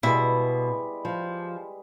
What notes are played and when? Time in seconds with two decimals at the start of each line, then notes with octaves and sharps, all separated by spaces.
0.03 B2 G3 G#3 E4 B4
1.05 F3